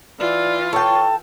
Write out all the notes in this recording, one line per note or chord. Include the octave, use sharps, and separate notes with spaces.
E3 F4 D5
A4 C#5 G5 A5